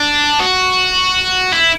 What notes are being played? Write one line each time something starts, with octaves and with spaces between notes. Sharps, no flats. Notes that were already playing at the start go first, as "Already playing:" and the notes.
Already playing: D4
F#4
E4